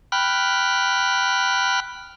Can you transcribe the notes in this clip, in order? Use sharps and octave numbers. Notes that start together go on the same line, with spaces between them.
G5 B5 F6 F#6